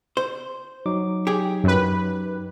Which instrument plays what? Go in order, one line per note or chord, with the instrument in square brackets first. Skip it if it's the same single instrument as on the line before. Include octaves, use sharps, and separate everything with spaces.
[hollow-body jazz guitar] C5
[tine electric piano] F#3 D#4 D6
[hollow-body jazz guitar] G4 G#4
[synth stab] F#2 B4